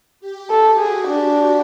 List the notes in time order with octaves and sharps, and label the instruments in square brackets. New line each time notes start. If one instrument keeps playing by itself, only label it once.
[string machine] G4
[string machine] G4 [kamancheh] A4
[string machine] F#4 [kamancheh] G#4
[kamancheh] D4 [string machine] F#4